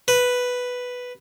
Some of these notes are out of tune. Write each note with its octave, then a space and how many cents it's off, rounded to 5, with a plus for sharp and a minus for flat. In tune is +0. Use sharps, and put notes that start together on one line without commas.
B4 +0